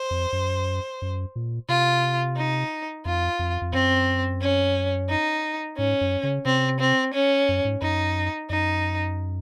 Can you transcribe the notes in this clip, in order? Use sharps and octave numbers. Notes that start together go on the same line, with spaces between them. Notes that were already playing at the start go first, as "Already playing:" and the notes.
Already playing: C5
F2
F#2
F#2
A#2
C3 F4
D#4
F2 F4
F2
F2
F#2 C4
C#4
D#4
G#2 C#4
F#2
C#3
C3 C4
C4
C#4
F#2
G#2
F#2 D#4
F#2 D#4